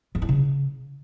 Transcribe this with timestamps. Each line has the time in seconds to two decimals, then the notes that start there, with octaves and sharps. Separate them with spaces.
0.15 E3
0.22 E4
0.29 C#3